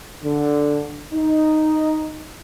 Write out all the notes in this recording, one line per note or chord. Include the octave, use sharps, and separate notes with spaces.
D3
D#4